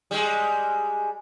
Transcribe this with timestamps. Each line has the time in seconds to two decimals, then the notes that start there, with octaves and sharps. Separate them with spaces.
0.11 G3 G#3